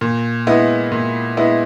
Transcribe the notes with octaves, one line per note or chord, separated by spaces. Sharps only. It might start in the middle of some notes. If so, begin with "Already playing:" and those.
A#2
G#3 B3 E4
A#2
G#3 B3 E4